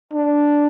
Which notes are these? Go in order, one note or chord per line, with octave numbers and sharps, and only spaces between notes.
D4